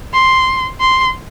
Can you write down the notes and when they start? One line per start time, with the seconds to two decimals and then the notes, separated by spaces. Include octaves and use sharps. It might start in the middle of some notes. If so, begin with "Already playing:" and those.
0.13 C6
0.80 C6